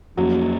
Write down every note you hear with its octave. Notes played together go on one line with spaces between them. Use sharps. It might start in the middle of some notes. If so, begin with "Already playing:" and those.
F2 F3 F#3 A#3 C#4